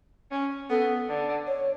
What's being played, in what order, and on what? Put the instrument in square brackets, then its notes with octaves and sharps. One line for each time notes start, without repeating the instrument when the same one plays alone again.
[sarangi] C#4
[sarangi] B3 [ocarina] A4
[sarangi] D3
[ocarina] C#5